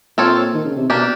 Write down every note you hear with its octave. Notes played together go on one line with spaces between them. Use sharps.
A#2 C4 F4 A4 C#5
D#3
C#3
C3
B2 A#3 D4 G4